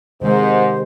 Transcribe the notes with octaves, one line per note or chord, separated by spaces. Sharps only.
G#2 C3 D#3 G#3 C5